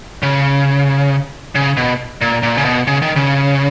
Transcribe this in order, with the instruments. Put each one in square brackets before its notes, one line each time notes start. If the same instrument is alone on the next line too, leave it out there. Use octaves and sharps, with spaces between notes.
[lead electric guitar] C#3
C#3
B2
A#2
A#2
C#3
B2
C#3
D#3
C#3